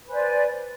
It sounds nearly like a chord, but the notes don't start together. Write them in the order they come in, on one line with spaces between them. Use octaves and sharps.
B4 C5 G#5 D5